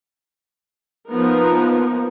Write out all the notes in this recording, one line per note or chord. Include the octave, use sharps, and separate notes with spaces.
F3 A#3 B3 D#4 A#4